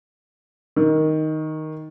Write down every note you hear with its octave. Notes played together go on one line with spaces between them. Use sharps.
D#3